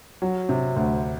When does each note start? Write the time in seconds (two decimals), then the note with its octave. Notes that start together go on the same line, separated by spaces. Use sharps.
0.22 F#3
0.49 C3
0.76 D2